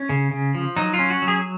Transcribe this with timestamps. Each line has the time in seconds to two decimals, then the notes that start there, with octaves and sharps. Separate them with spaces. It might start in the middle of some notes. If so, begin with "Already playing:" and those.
Already playing: C#4
0.09 C#3
0.31 C#3
0.55 F3
0.76 F#3 D#4
0.94 F4
0.99 C#4
1.10 F#4
1.22 F#3
1.28 G#4